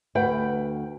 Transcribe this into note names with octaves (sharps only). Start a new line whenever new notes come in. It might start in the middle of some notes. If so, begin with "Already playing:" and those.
D2 B4 F#5 G5